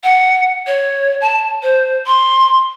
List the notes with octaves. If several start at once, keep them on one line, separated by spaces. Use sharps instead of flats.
F#5
C#5
A5
C5
C6